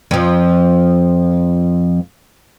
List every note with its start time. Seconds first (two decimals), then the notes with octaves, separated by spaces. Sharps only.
0.11 F2 F3